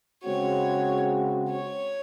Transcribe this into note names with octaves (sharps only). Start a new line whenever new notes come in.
C#3 G#3 C4 F#4 C#5
C#5